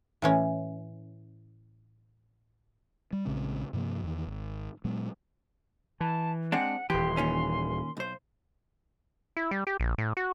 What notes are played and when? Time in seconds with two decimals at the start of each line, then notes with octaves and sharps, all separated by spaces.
0.22 A2 E3 C#4
3.13 G3
3.25 A#1 C#3 G#3 C4
3.73 G2 C3 F3 A#3
4.04 E2 D#3
4.27 G#1
4.85 A#2 F#3 G#3 B3
6.01 E3 A5
6.52 G#3 C4 D4 F#5
6.90 D#1 E3 G4 C6
7.17 A#2 D#3 C#4
7.97 B1 C5
9.37 E4
9.51 G3
9.67 G4
9.80 A#1
9.98 A2
10.17 F#4